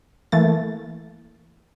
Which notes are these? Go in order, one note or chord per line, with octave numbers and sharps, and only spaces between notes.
E3 A3 A#3 A6